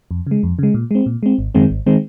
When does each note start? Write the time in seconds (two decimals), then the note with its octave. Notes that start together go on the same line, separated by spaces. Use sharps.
0.11 F2
0.27 C#3 G#3
0.43 F2
0.59 C#3 G#3
0.74 A#2
0.91 G#3 C4
1.06 A#2
1.23 G#3 C4
1.39 G#1
1.55 F#2 D#3 G#3 C4
1.70 G#1
1.86 D#3 G#3 C4